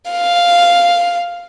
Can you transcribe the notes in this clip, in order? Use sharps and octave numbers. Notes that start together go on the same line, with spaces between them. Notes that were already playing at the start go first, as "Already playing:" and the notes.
F5